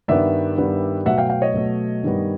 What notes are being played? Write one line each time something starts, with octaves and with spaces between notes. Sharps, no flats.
G2 D#3 G3 B3 D5 E5
G2 D#3 G3 B3
B2 F#3 A3 E5 F#5
F5 G5
F5 G5
C#5 D#5
B2 F#3 A3
G2 D#3 G3 B3